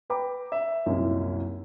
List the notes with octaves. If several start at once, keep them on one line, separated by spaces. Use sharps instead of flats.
B4 G5 A#5 B5 D6
E5
C2 F#2 A#2 A#3 D#4 E4